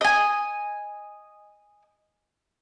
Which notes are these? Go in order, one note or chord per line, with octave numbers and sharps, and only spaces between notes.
D#5 G#5